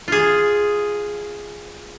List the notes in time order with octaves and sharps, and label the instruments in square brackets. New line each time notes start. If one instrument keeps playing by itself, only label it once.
[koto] F4 G#4